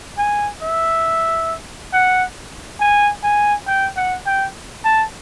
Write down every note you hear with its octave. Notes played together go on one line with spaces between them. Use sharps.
G#5
E5
F#5
G#5
G#5
G5
F#5
G5
A5